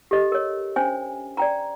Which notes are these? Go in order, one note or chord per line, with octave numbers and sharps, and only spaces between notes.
G4 A4 D#5
A#4 C#5
C#4 D4 C5 G#5
D5 G5 A#5